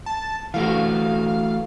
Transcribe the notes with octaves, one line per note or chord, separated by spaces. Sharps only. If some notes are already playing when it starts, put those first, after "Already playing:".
A5
E3 A3 F#4 F5